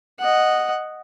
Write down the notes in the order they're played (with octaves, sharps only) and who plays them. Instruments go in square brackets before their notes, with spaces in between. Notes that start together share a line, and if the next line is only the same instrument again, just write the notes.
[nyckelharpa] D#5 F#5